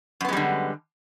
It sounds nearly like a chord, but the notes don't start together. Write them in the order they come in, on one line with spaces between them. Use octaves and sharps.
F#2 B3 G#3 G3 D3